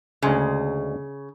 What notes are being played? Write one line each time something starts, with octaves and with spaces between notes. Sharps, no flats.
D2 C#3 G#3 G#5